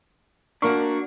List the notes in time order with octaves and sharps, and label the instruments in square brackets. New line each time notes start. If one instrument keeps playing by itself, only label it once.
[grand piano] A#3 A#4 C#6 [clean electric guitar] D4 F#4